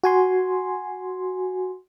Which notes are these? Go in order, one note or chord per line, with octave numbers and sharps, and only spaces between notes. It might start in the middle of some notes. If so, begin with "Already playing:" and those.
F#4 G#5 C6